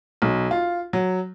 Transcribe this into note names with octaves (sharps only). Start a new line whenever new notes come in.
B1
F4
F#3